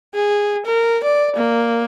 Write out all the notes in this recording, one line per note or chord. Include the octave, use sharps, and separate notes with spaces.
G#4
A#4
D5
A#3